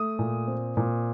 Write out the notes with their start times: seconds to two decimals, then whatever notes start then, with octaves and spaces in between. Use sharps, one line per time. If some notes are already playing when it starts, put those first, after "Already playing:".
Already playing: A3 D#6
0.19 A#2
0.48 C4
0.77 A#2